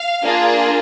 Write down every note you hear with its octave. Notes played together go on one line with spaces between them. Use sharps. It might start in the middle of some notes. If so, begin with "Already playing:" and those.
Already playing: F5
A#3 D4 F4 G#4